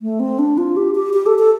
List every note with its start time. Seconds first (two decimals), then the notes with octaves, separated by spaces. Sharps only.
0.02 A3
0.20 C4
0.39 D4
0.58 F4
0.77 G4
0.95 G4
1.14 G4
1.26 A4
1.39 A4